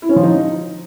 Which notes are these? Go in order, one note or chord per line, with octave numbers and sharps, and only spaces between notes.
E4
C#4
F3
D#4